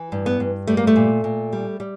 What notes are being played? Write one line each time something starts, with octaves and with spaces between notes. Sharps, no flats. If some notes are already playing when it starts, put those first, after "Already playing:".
Already playing: E3
G2
B3
G2
G3 A3
A#3
A3
A#2
A#2
G3
G3